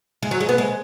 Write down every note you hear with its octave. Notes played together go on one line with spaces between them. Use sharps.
G#3
F#3
G#3
B3
G#3